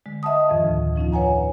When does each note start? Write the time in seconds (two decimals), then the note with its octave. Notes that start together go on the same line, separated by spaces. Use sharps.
0.06 D3 G#3
0.23 D#5 E5 F#5 A5 D#6
0.49 F2 A2 D#3 F3
0.64 D2
0.96 F3 C#4 D#4 F4
1.12 B4 C#5 F#5 G#5 A#5